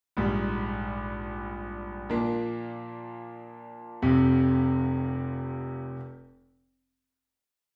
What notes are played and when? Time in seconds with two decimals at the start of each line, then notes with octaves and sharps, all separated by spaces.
0.17 A#1 G#2 G3
2.10 A#2 F3 A#3 D4
4.02 F1 F2 C3